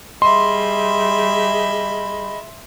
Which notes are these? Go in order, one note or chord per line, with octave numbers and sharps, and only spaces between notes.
G3 G#4 D#5 E5 B5 C6